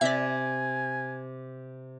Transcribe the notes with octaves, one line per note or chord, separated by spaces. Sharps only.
C3 G4 D5 E5 G#5